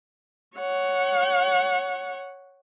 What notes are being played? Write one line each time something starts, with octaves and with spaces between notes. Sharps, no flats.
C#5 F#5